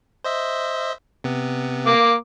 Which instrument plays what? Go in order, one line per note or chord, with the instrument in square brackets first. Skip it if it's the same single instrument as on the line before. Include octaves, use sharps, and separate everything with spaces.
[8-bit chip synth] C5 D#5 E5
C3 B3
[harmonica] A#3 D6